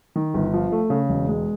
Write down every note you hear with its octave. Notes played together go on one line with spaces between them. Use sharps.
D#3
G1
F3
A3
C#3
E1
G#3